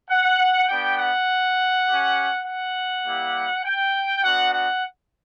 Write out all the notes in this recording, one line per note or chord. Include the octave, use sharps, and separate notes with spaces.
F#5
B3 D4 G4 G5
F#5
C#4 G4
F#5
G3 A#3 E4 G4
G5
B3 D4 F#4 F#5
F#5